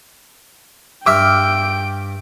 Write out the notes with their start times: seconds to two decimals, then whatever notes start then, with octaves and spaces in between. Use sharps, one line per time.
1.06 G2 E5 G5 D6 E6 F6 D7